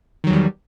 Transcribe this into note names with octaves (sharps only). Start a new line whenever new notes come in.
E2 D#3 F#3 G3